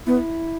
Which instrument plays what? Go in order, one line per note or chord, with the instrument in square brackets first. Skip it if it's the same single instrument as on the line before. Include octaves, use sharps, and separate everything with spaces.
[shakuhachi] B3 [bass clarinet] E4